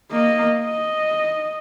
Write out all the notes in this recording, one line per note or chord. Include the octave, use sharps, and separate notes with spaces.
A#3 D#5
D#5